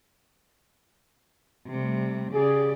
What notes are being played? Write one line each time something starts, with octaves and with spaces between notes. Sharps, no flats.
C3 G3 A3
C#3 G4 G#4 D5